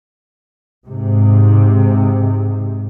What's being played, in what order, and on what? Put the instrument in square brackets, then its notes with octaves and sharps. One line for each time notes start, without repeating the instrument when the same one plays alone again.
[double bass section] G#2 C3